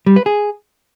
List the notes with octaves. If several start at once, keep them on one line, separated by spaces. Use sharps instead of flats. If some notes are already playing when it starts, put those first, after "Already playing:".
G3
B4
G#4